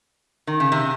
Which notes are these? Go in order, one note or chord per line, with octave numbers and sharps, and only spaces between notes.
D#3
C#3
C3